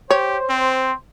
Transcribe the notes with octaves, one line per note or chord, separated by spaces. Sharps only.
G4 C5 C#5
C4